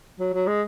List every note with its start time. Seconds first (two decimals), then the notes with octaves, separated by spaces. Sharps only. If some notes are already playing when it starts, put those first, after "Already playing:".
0.20 F#3
0.34 F#3
0.47 G#3